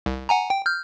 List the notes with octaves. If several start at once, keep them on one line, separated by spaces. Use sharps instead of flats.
C2
F#5 G#5 A#5
G5
F6 G6